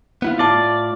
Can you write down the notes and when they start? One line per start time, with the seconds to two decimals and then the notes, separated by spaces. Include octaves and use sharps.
0.22 B3 E4 F4
0.39 A2 F4 D5 A5